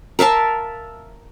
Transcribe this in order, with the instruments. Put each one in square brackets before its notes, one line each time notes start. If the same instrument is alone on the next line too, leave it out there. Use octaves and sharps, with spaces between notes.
[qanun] A#4 E5 F5 A5